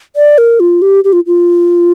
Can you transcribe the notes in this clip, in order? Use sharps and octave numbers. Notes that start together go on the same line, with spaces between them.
D5
A#4
F4
G4
G4
F4
F4